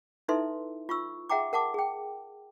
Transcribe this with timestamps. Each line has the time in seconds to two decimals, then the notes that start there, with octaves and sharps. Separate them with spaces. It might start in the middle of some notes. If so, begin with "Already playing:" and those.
0.28 D#4 E4 A4 B4 E5 C6
0.89 F4 C#6 E6
1.29 G#4 E5 F#5 G5 A#5 D6
1.53 A#4 F#5 A5 D6
1.74 G#4 G5